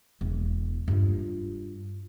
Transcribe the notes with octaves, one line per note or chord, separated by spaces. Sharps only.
E1
G2 F4